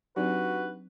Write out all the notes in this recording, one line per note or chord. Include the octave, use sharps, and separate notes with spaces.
F#3 C4 D4 D#4 F#4 G4 B4